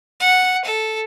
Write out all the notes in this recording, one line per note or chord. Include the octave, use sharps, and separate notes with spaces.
F#5
A4